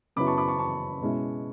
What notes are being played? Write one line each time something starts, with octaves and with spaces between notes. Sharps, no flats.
F#2 C#3 F#3 B3 E4 B5 D6
A5 C#6
B5 D6
A5 C#6
A5 C#6
B2 G#3 C#4 E4